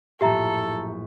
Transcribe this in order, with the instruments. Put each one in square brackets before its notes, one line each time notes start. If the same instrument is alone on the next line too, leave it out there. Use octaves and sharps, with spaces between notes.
[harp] A#1 F#2 A2 [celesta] G4 E5 A#5 [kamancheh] A4